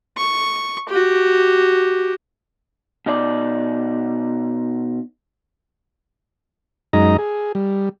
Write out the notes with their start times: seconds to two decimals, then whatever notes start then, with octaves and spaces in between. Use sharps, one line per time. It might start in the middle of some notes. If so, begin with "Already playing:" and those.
0.17 C#6
0.89 F#4 G4
3.06 B2 D#4 D5
6.93 F#2 G#3 D#4 D#5 A#5
7.18 G#4
7.55 G3